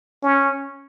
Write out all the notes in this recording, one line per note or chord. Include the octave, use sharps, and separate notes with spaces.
C#4